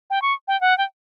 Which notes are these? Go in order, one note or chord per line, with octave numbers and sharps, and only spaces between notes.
G5
C#6
G5
F#5
G5